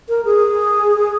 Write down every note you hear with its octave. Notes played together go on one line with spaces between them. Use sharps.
A#4
G#4